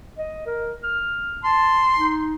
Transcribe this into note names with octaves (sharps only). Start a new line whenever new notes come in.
D#5
A#4
F6
A5 C6
D#4